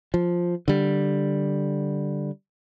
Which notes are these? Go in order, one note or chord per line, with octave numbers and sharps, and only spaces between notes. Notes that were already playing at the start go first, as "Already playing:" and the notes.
F3
D3 G3